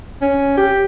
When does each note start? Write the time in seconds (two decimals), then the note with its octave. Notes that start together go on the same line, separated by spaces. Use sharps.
0.21 C#4
0.57 G4